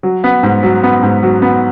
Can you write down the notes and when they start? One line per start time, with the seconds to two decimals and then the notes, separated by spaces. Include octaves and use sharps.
0.03 F#3
0.24 B3
0.43 G#2
0.63 F#3
0.83 B3
1.03 G#2
1.23 F#3
1.42 B3